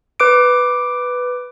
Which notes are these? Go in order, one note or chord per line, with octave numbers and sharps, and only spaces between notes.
B4 D6 D7